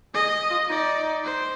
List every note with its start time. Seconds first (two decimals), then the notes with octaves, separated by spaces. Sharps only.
0.14 G#4 D#5
0.50 F4
0.69 D#4 D5
1.24 C5